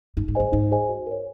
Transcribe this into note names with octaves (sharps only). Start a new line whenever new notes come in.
G2 D#4
G#2
G2 G#4 C5 D#5 G#5
G#2 D#4
G#4 C5 D#5 G#5
F#4
A#4 C#5